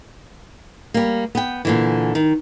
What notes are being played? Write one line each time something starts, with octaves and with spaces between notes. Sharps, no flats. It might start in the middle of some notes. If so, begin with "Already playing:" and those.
G3 A#3
B3 G5
A#2 D3 E3
D#3